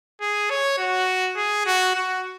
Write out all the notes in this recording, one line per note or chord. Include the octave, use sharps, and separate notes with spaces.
G#4
C#5
F#4
G#4
F#4
F#4